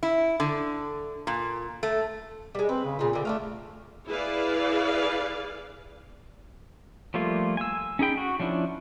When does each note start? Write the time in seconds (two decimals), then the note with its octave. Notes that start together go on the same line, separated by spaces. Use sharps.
0.03 E4
0.40 D3
1.27 A#2
1.83 A3
2.55 G3 G#3
2.69 C4 B4
2.85 C#3
2.99 A#2 C#3 F4
3.13 D3 C4
3.25 A3 D4 F4 F5
4.08 E4 G#4 B4 D5 F5
7.14 F3 G3 A3 A#3 F4
7.57 G#5 E6
7.99 C#4 D#4 G#4 G5 B5
8.17 F#4
8.40 F3 C#4 D4 E4